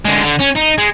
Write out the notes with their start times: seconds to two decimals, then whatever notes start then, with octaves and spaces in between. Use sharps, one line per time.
0.05 D3 G#3
0.24 D3
0.40 C#4
0.56 D#4
0.78 G#3